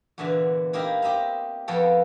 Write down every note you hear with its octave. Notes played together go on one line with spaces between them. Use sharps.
E2 A#2 D3 E3 F#4 E5
A#3 D#4 E4 G4 A#4 E5
C4 G4 D#5 E5 A#5
F2 A#3 B3 A4 C#5 G5